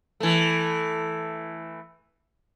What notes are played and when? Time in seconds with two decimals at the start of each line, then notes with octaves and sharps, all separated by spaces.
0.20 E3 A3